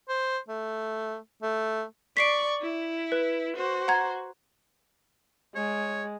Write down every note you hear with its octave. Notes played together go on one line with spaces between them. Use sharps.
C5
A3
A3
D5 C#6 B6 C7 D7
E4
B4
F#4 C5
F#5 A#5 G#6
G#3 C#5